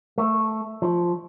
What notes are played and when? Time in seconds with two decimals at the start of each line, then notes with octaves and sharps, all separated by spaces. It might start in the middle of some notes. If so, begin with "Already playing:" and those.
0.18 A3
0.82 F3